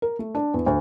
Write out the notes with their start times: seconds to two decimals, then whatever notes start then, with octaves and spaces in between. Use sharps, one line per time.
0.02 A#4
0.19 A3
0.35 D4
0.54 E2
0.66 D2